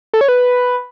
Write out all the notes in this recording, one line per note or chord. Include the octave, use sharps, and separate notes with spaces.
A4
C#5
B4